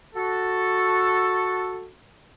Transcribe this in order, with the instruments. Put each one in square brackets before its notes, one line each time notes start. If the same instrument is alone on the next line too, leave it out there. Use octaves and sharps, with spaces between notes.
[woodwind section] F#4 A4